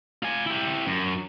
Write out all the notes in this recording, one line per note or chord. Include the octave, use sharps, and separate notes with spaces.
F4 G#5
E4 G4
F#2